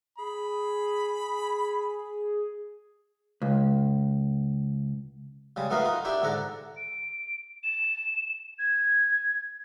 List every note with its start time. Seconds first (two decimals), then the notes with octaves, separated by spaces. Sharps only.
0.18 G#4 B5
3.42 C#2
5.56 C#3 G3 G#3
5.70 A3 B3 D#4 F#4 A#4 F5
5.84 D#4 F4 A#4
6.05 D4 E4 G4 G5
6.22 G#2 D3 A4 F#5 A#5
6.77 D7
7.63 E7
8.59 G#6